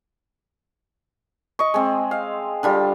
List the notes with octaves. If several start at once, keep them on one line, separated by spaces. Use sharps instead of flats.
D#5 C#6
G#3 C4
F5
D3 G3 F4